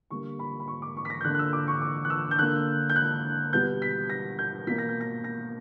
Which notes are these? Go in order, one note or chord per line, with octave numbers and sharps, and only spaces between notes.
D3 G3 A#3 C#6
B5
B5
C#6
D6
C#6
B6
A#6
G6
D3 A#3 F#6
F#6
E6
D6
C#6
D6
F#6
E6
G6
D3 A#3 F#6
G6
F#6
B2 G3 B3 G6
B6
A#6
G6
B2 A#3 B6
A#6
G6
A#6
A#6